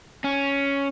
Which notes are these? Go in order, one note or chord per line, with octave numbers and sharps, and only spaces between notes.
C#4